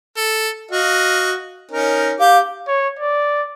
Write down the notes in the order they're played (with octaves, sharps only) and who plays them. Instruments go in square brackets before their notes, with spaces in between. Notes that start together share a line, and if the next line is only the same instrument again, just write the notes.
[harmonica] A4
F#4 D#5 F5
C#4 D#4 A#4
[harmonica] G4 D6 [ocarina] F5
[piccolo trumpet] C#5
D5